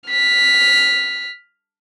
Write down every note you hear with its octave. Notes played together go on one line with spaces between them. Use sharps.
F6 B6